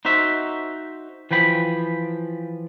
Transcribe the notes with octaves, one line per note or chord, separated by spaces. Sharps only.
D#4 F#4 C5 E5
E3 F3 G5 B5